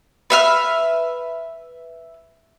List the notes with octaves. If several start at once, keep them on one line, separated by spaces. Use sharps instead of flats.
B4 E5 F6